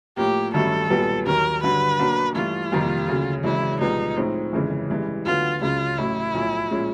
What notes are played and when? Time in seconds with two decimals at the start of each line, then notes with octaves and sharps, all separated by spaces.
0.17 A2 F3 A#3 G4
0.54 A1 G2 D#3 F#3 A3 A4
0.90 B1 A#2 G3 B3
1.26 D#2 D#3 F#3 A#4
1.63 G2 D3 F#3 B4
1.99 B2 F#3 A#3 D4 F#4
2.35 G2 E3 A3 F4
2.72 F2 C3 D#3 G3 A#3
3.08 D2 C#3 F#3
3.44 G#1 F#2 C#3 E3 G#3 E4
3.80 C2 A#2 F3 G#3 B3 D#4
4.16 A2 F3 G#3 C4 D#4
4.53 G1 F2 C#3 E3 G#3
4.90 A1 G2 E3 G#3
5.25 D2 D3 F#3 B3 F4
5.62 C#2 C#3 F#3 F4
5.98 A1 A2 F#3 E4
6.34 B1 A2 F3
6.70 A#2 F3 G#3 C#4